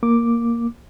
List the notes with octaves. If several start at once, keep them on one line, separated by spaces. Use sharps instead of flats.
A#3 D6